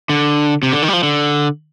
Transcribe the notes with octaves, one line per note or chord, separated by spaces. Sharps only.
D3
C3
D3
D#3
G3
F3
D3